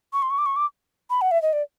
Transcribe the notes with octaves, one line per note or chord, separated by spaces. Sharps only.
C#6
C6
C#6
D6
C#6
D6
B5
F#5
E5
D#5
D5